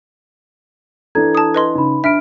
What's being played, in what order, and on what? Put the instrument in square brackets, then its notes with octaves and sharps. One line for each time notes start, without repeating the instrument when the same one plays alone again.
[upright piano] E3 D4 [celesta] A4 A#5 G#6
[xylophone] A5 D#6
B4 D#5 C6
[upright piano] C#3 [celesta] D#4 B5
[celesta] D4 F6 D7 [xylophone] E5 [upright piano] B5 B6